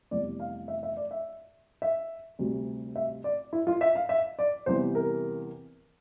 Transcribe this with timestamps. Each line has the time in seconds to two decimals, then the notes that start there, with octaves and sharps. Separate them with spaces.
0.11 F1 E2 C3 E3 G3 D5
0.40 F5
0.68 E5
0.83 E5
0.97 D5
1.11 E5
1.82 E5
2.39 D2 C3 G3
2.96 E5
3.24 D5
3.53 E4
3.67 F4
3.81 E5
3.95 F5
4.09 E5
4.39 D5
4.66 E2 C3 E3 G3 C5
4.95 A#4